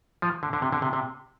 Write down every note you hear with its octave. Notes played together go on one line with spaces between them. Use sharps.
F3
D3
D3
C3
D3
C3
C3